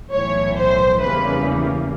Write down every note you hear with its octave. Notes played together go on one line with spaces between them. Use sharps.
B1 A2 E3 C#5
C5
E2 C#3 E3 G3 A#3 B4